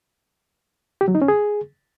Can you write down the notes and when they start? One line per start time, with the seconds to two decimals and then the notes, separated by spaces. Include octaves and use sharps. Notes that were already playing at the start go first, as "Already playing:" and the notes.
1.01 G4
1.08 F#3
1.15 D#4
1.22 C#4
1.28 G#4